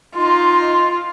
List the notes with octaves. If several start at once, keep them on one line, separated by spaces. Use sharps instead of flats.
D#4 F4 D#5 C6